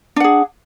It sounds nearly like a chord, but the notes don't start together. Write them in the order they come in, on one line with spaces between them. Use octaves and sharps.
D4 F#5 G#4